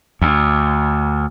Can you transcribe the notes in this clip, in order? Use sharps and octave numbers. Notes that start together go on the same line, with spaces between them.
D2